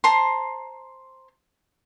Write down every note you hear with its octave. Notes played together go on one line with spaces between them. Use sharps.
C5 A5 A#5 C6